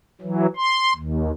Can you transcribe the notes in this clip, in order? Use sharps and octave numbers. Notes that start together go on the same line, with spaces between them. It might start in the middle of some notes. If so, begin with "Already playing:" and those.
E3 F#3
C6
D#2